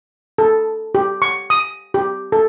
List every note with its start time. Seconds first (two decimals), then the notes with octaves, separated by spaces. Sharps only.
0.38 A4
0.95 G4
1.22 C#6
1.50 D#6
1.94 G4
2.32 A4